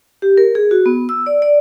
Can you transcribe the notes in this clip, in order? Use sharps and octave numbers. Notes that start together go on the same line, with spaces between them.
G4
A#4
G#4
F#4
B3
E6
D5
D5